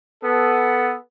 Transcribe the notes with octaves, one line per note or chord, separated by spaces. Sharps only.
B3 A4